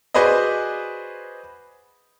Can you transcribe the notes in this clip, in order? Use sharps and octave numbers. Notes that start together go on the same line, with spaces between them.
F#4 G#4 B4 C5 D5 D#5